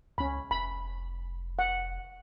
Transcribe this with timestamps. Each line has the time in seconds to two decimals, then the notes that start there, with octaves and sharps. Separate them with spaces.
0.18 C#2 C#4 B5
0.51 F1 B5
1.59 F#5